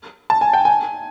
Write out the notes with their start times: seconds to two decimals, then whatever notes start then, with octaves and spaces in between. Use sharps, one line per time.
0.30 A5
0.41 G#5
0.53 G5
0.65 G#5